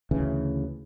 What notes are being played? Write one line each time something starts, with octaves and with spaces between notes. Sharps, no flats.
D2 C#3 E3